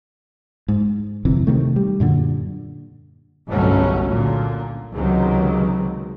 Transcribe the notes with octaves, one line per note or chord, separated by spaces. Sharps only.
G#2
G1 F2 C3 E3
C3 D#3 A3
G3
F#2 A#2 D3
G1 C2 B2 F#3 A3 C#4
A#2 D3
C#2 C3 D#3 F#3